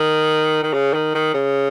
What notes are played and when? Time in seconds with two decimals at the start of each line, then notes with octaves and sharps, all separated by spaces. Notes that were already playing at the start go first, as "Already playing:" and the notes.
Already playing: D#3
0.63 D#3
0.74 C#3
0.93 D#3
1.15 D#3
1.34 C#3